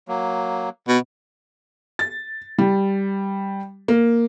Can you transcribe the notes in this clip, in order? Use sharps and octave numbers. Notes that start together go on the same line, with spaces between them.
F#3 A#3
B2
A6
G3
A#3